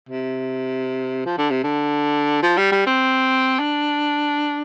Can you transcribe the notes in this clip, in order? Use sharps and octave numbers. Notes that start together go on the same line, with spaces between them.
C3
F3
D3
C3
D3
F3
G3
G3
C4
D4